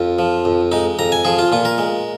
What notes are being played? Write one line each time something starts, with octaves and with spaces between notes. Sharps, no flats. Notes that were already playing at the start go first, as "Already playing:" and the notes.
Already playing: F2 F4
F3
F2
G#3 D#4
F2 A#5
G#5
F3 G#4
F4
A#2 F4
A#4
G#3